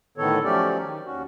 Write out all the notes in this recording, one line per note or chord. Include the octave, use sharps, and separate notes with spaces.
A2 D3 D#3 B3 A4 C#5
F3 F#3 A3 C#4 G4 D5
D#3
D#2 C#4 F#4